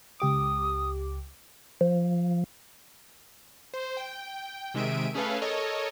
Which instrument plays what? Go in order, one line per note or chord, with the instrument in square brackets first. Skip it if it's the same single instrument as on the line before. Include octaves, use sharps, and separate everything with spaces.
[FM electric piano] C#2 G4 D6 [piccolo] D#6
[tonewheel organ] F3
[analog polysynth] C5
G5
C3 D#3 G#3 E5 D7 D#7
A3 C#4 G#4 A4 B4 F5
A4 A#4 C#5 D#5